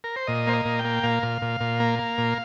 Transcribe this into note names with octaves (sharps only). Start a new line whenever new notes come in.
A#4
C5
A#2 D#5
A#3 C5
D#5
A#2
G5
A#3
A#2 F5
A#2
A#2
A#2
A#3
A#3
A#2